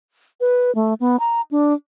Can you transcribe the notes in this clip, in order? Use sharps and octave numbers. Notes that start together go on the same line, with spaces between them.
B4
A3
B3
A#5
D4